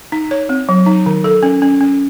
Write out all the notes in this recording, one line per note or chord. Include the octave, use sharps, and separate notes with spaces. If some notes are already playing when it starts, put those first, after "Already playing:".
D#4
C#5
C4
F#3
D#4
D#3
A4
C#4
C#4
C#4